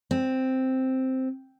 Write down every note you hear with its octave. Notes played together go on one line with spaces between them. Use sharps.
C4